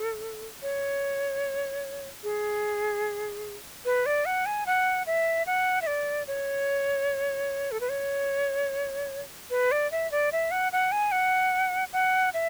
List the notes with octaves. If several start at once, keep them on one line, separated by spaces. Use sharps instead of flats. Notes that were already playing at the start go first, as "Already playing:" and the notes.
Already playing: A4
C#5
G#4
B4
D5
F#5
G#5
F#5
E5
F#5
E5
D5
C#5
A4
B4
C#5
B4
D5
E5
D5
E5
F#5
F#5
G#5
F#5
F#5
E5